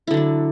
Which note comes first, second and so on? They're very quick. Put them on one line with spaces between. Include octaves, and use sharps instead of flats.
E4 D3 F#3 D4